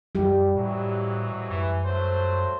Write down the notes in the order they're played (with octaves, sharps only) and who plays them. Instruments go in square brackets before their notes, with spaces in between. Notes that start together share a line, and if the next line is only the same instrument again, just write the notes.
[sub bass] F#2 [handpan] G3 G4
[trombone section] F2 E3 F#3 [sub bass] A2
[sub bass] F#2 [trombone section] E3
[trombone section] F#3 A3 C5